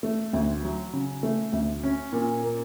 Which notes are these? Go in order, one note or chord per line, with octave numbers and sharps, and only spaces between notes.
A3
D2
F#3
C#3
A3
D2
C#4
A#2
A#3